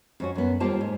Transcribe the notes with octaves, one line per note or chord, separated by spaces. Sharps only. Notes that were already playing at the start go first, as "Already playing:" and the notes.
F2 C#4 F#4
F#2 B3
D#2 G3 A#3 F4 C5 A5
G#2